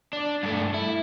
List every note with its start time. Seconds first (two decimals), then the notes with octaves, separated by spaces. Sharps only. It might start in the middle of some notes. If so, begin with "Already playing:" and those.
0.13 D4
0.43 G2 A3
0.74 E4